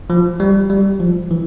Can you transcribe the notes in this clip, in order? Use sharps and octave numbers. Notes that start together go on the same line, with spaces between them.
F3
G3
G3
F3
E3